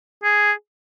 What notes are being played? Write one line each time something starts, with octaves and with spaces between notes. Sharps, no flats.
G#4